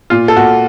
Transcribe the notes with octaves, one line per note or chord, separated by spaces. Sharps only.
A#2 F4
A4
A#2 F#4